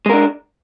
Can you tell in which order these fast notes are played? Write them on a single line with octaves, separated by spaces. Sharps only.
G#3 A#4 D4